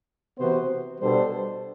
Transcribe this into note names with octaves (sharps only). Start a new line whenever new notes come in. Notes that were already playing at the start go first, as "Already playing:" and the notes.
C3 E3 B3 F#4 C5
B2 G3 D4 A4 C5